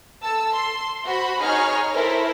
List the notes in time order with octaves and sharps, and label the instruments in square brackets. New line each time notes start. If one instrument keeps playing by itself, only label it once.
[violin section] A4 A5 E6
C6
F#4 C5 B5
D#4 G#4 C#5 F6
E4 A4 A#4 C5